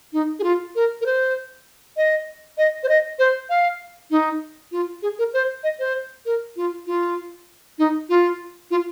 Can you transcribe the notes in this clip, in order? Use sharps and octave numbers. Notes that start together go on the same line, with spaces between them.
D#4
G#4
F4
A#4
A#4
C5
D#5
D#5
C5
D#5
C5
F5
D#4
F4
G#4
A#4
C5
D#5
C5
A#4
F4
F4
D#4
F4
F4